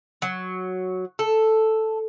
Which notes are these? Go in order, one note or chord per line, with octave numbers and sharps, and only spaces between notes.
F#3
A4